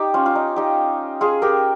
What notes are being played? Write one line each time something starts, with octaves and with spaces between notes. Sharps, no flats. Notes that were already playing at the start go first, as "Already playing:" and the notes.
Already playing: D#4 G4
C#4 F4
F4
D#4
D#4 G4
F4 G#4
G4 A#4